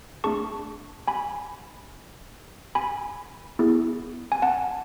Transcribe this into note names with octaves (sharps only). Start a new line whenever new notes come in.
A3 D4 G#4 A5 C#6
G#5 B5
G#5 B5
B3 E4 G#4
G#5
F#5 A5